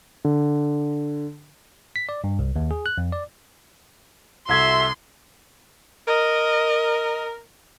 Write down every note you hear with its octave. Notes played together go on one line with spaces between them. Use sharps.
D3
B6
D5
G2
C2
D#2
G#4
F#6
F2
D5
C2 F#4 A4 E5 C6 G#6
A#4 D#5